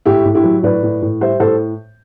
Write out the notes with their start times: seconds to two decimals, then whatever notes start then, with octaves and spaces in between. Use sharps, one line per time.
0.06 A2 E4 G4
0.25 A2
0.34 E4 G4
0.44 F#3
0.63 A2 B4 D5
0.83 A2
1.02 A2
1.21 G3 C5 E5
1.40 A2 A4 C5